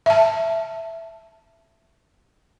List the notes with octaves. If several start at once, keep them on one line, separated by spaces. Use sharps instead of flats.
E5 A5